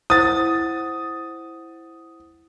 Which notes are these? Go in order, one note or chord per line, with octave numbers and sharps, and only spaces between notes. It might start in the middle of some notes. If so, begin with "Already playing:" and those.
E4 C5 F#5 D#6 A6